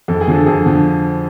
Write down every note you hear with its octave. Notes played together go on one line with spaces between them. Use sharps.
F2 A4
G#4
D3 F3
A4
F2 G#4
D3 F3